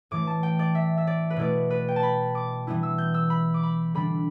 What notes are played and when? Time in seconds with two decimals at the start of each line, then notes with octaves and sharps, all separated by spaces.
0.11 A2 E3 A3 D6
0.27 A5
0.43 G5
0.59 D5
0.75 E5
0.98 E5
1.07 D5
1.30 B4
1.37 B2 A3 E4 D5
1.70 B4
1.88 G5
1.96 A5
2.03 B5
2.35 D6
2.67 E3 G3 B3 E4
2.83 E6
2.98 G6
3.14 E6
3.30 B5
3.54 D6
3.63 B5
3.94 D3 G3 D4 B5